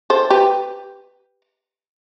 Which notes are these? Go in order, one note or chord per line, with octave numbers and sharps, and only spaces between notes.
A4 C5
G4 B4